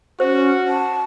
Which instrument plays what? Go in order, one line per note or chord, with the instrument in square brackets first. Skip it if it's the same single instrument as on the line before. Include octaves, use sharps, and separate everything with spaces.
[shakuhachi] C#4 [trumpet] F#4 [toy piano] C5
[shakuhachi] A5